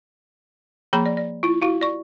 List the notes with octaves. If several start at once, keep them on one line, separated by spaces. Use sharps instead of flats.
F3 A#3 G#4 A#5 B5
D5
D5
E4 F4
E4 F#4 F5
D5 C#6